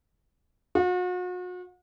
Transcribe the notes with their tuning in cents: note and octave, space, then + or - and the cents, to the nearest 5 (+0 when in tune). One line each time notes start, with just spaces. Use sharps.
F#4 -40